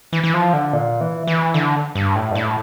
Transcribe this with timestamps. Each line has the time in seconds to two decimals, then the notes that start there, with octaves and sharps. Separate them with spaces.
0.13 E3
0.24 E3
0.33 F3
0.53 D3
0.73 A#2
1.01 E3
1.27 E3
1.54 D3
1.95 G2
2.16 A2
2.31 G2
2.35 A2